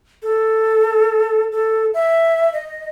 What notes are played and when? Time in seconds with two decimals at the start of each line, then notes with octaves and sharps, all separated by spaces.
0.23 A4
1.52 A4
1.94 E5
2.53 D#5